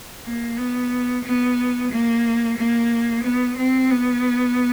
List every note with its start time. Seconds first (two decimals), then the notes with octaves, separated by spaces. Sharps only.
0.25 A#3
0.58 B3
1.25 B3
1.92 A#3
2.58 A#3
3.24 B3
3.57 C4
3.91 B3